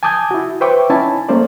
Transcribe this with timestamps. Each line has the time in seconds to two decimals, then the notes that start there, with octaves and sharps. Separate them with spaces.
0.03 G#5 A5 D6 D#6 G6 G#6
0.31 E4 F#4
0.61 B4 C5 E5 G5 C#6 D6
0.90 C#4 D#4 E4 G#5 A5 B5
1.29 A3 A#3 C#4 C5 D5